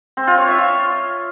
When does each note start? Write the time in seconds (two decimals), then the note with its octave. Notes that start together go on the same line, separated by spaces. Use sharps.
0.17 C4
0.27 F4
0.38 C#5
0.48 E5
0.58 F4